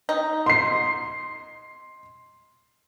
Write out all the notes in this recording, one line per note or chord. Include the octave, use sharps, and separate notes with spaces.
D#4
C6 C7